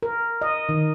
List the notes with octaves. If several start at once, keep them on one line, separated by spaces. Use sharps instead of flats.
A#4
D#5
D#3